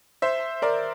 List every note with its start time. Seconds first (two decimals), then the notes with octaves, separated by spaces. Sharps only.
0.22 C5 E5
0.62 A#4 D5